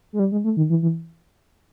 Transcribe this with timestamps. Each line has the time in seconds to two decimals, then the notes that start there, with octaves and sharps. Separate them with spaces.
0.13 G#3
0.19 G3
0.32 G#3
0.44 A3
0.57 D#3
0.70 E3
0.82 E3